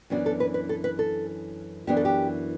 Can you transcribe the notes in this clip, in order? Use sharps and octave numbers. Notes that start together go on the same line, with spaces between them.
F#2 E3 B3 D4 F#4
A4
B4
B4
A4
B4
A4
F#2 E3 B3 D4 G4
A4
G4